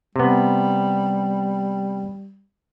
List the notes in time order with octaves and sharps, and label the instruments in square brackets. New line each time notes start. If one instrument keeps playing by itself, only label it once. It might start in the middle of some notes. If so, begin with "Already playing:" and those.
[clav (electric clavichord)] C3 B3 [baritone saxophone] G3